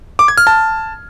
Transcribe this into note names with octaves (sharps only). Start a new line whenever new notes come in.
D6
G#6
F6
A5